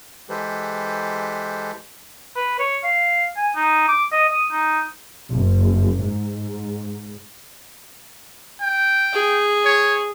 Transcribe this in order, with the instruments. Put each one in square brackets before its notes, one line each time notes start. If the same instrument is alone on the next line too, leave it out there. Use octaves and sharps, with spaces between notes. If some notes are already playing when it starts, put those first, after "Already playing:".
[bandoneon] E3 G#3 G4 A4 B4 C5
[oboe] B4
C#5
F5
G#5
D#4
D6
D#5
D#6
D#4
[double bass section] F#1
G#2
[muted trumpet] G5
[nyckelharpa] G#4
[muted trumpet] C#5